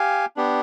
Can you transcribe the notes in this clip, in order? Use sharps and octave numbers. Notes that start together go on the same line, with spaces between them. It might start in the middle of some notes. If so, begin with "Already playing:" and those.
Already playing: G4 F5 G#5
B3 D4 G4